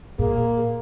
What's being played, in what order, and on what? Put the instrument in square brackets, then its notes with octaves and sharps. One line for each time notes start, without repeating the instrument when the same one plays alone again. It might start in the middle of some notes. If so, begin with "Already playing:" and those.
[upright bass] A#2 [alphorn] A#3 [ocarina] G#4